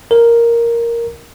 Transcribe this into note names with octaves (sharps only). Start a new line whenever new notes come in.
A#4